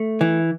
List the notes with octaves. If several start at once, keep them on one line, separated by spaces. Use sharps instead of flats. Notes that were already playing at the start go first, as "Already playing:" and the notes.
Already playing: A3
E3